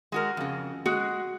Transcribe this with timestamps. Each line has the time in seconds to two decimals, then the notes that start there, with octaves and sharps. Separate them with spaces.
0.12 G#3 F#4 A#4
0.37 F2 C#3
0.86 G#3 F#4